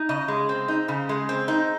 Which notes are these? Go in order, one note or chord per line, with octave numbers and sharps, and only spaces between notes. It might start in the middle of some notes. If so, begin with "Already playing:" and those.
Already playing: D#4
C#3 D#5
G#3
C4
D#4
C#3
G#3
C4
D#4